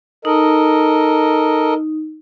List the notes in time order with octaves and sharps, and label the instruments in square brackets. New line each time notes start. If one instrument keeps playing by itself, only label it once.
[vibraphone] D#4 [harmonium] A4 A#4 D#5